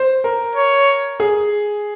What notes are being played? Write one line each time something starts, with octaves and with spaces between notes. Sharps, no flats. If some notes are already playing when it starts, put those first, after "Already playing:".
Already playing: C5
A#4
C#5
G#4